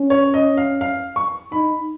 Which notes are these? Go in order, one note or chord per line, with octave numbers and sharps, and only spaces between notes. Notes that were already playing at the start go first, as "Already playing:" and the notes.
Already playing: C#4
C#5
D#5
F5
F5
C#6
D#4 B5